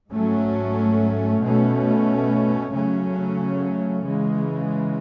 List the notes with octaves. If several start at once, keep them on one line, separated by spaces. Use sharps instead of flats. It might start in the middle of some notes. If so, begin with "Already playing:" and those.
G#2 F#3 A3 C#4
B2 A3 C#4
C#3 F#3 A3 C#4
C#3 E3 G#3